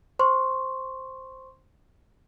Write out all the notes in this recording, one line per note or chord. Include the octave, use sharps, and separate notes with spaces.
C5 C6 C#6